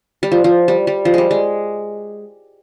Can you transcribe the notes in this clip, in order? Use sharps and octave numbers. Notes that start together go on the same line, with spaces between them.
G3
F3
F3
G3
G3
F3
G3 G#3
G#3